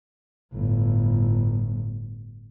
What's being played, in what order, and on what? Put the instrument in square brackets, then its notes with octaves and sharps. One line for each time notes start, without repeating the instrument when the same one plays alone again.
[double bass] G1 A2